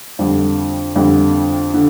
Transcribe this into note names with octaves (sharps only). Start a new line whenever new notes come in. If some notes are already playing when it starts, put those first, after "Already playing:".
F2 D3 G3
F2 D3 G3
D3